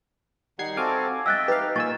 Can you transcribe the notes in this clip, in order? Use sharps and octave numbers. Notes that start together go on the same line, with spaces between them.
D#3 G3 D#4 F#5 G#6 C7
C4 F#4 A4 F5 G#5 D6
D#5 E5 G5 E6 F#6 A6
D#4 G4 B4 F5
A#2 G#5 C#6 E6 A6